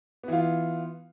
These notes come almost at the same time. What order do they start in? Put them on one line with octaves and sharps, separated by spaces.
B3 E3 F4